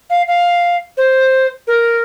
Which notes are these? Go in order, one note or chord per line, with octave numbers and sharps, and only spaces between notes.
F5
F5
C5
A#4